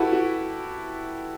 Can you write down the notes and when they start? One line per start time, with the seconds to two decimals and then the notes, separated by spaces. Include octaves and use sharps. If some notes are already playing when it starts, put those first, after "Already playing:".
Already playing: E4 F#4 G4 A4 B4
0.13 F#4